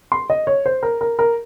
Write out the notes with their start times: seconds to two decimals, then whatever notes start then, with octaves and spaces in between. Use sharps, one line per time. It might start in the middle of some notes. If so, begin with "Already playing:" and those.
0.12 C6
0.30 D#5
0.47 C#5
0.66 C5
0.83 A#4
1.01 A#4
1.19 A#4